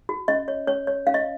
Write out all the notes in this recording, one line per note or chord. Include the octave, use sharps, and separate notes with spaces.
F#4
C#4 D#5
C#5
C#4 C#5
C#5
C#4 F5
D#5